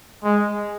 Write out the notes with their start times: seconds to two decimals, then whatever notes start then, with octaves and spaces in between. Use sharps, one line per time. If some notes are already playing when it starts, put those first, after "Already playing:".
0.24 G#3